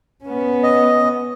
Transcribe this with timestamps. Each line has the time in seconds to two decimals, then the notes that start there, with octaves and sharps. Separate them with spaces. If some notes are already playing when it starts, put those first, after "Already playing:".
0.24 B3 C#4
0.63 D#5